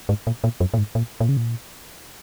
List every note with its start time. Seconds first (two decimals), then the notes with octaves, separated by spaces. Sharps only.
0.09 G#2
0.27 A#2
0.44 A#2
0.60 F#2
0.74 A#2
0.78 G#2
0.95 A#2
1.20 A#2
1.29 C#3
1.37 A#2